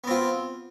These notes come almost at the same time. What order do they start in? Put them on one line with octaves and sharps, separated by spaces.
B3 C4 F4